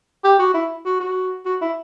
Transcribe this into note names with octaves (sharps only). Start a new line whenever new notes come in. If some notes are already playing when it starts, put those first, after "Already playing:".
G4
F#4
E4
F#4
F#4
F#4
E4